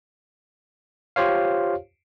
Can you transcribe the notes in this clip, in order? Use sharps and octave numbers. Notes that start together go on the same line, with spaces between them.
F4 G4 C5 C#5 F5